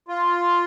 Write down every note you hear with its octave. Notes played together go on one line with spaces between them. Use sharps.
F4